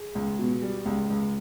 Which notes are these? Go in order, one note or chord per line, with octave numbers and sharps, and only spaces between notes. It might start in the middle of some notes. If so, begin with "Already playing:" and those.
Already playing: G#4
C#2
B2
G3
C#2
C#2